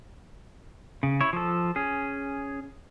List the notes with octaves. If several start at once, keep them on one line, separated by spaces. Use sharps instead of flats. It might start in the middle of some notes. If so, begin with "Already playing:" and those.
C#3
E4 C#5
F3 A4
C#4 G#4